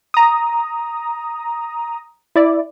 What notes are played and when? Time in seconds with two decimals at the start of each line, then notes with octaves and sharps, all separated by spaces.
0.14 A#5 D#6
2.36 E4 D5